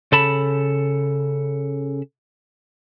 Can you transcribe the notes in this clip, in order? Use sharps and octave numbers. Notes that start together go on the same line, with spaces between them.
C#3 A4 A5 B5